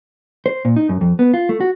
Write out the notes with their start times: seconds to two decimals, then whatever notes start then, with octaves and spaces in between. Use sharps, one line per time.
0.46 C5
0.65 A#2
0.76 D#4
0.89 F#2
1.01 F2
1.19 B3
1.34 F4
1.49 A3
1.61 F#4